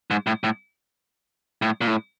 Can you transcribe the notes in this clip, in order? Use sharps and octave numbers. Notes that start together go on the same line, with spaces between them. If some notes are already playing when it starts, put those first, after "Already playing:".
G#2
A2
A2
A2
A#2
A2